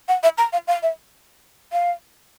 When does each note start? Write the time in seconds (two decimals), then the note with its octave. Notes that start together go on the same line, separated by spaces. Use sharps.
0.08 F#5
0.23 E5
0.38 A#5
0.53 F5
0.67 F5
0.83 E5
1.73 F5